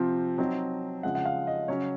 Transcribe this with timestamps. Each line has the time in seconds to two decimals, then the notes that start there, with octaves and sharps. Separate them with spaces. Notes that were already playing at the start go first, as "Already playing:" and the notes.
Already playing: C3 F3 C4 F4
0.38 F#3 C4 D#4
1.03 C#3 F3 G#3 F#5
1.15 F#5
1.25 F5
1.47 D#5
1.68 C#3 F#3 C#4 C#5